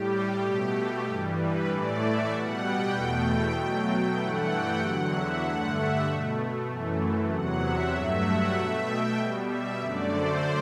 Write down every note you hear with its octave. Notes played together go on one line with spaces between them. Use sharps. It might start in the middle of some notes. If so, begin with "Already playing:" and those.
Already playing: A2 G3 G4
B2 A3
G2 E3 G3
B4
A2 E3 A3 D5
E5
B2 G3 F#5
G5
E2 B2 A3
B2 F#3 A3
G2 E3 A3 F#5
G5
E2 D3 F#3 F#5
E5
G2 D3 A3 F#5
E5
B2 A3
F#2 E3 A3
E2 C3 F#3 F#5
E5
G2 F#3 A3 E5
F#5
B2 A3 E5
G5
B2 G3
E5
F#2 D3 A3 D5
C5